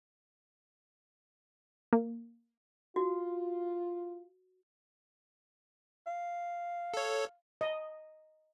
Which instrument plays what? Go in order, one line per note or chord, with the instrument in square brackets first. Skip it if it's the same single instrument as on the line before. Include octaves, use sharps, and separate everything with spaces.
[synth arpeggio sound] A#3
[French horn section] F4 [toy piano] F#4
[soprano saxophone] F5
[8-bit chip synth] A4 C#5
[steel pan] D#5